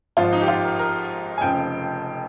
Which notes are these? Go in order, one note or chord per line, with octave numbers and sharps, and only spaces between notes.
G#1 G#2 F3 F4
D#4
G4
F4
A#4
A#4
G#5
F1 F2 C#3 F3 G5